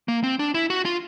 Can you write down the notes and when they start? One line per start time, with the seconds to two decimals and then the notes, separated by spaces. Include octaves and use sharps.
0.08 A#3
0.23 C4
0.39 D4
0.54 E4
0.70 F#4
0.85 F4